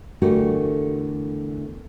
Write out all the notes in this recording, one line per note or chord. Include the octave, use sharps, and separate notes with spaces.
E2 D3 A3 F#4 G4 A#4